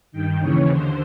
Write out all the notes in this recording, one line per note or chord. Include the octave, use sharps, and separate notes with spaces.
G2 D#3 G5
D#2 C#3 E3 C#5
D#2 D3 C5